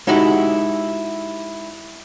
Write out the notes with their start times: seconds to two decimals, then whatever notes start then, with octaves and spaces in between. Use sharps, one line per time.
0.07 G#3 D#4 E4 F#4 G4